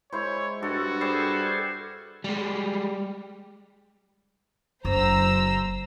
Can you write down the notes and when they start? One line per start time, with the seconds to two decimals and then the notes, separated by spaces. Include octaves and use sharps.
0.13 G#3 E4 C5 C#5
0.63 G2 F#4 A4
1.01 G3 G#4 A4 C5
2.24 G3 G#3
4.85 F#1 C5 A#5 E6